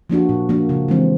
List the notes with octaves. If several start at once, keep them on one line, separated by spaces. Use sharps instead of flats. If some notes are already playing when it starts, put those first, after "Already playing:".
F3 A#3 D4 F#4
A#2
F3 A#3 D4 F#4
C#3
E3 G#3 C4